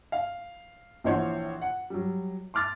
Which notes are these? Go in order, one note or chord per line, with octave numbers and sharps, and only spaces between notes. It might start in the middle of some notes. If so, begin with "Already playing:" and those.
F5
A#1 E3 C5 C#5 F#5 C6
F#5
F#3 G3
C6 D6 F6 A6